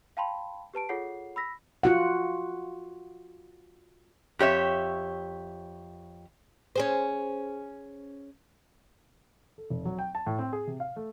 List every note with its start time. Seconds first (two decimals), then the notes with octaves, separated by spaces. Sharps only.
0.17 F5 G5 A5 B5 C6
0.74 G4 B4 A5 D7
0.89 F4 G#4 A4 C#5 F#5 C7
1.36 B5 E6 A#6 B6
1.83 F4 F#4 F#5
4.39 F2 G4 C#5 E5
6.76 C#4 G#4 C5
9.58 A4
9.70 F1
9.85 F#3
9.99 G5
10.15 A5
10.26 A2
10.39 C4
10.53 G#4
10.67 C3
10.80 F5
10.96 A3